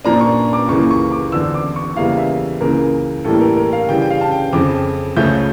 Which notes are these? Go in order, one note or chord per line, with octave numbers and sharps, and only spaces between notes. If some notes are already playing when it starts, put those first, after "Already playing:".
A#2 F3 A#3 D4 A#5
C#6
D6
C#2 C#3 E3 A#3 C#6
C#6
D6
E2 D3 F3 E6
D6
C#6
E2 C#3 G3 A#3 E4 F5
E5
C#2 C#3 E3 A#3 A#4
A2 E3 G3 A#3 A4
A#4
A#4
F5
C#3 E3 G3 G5
G5
F5
A5
G5
F2 C#3 F3 D6
C#2 C#3 F3 A3 C#4 G6